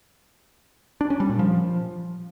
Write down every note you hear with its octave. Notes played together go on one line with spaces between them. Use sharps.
D4
C#4
G3
A#2
F3